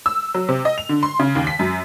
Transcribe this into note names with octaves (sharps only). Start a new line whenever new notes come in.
E6
F#3
C3
D#5
F7
D3
C6
C#3
D#2
B6
F#2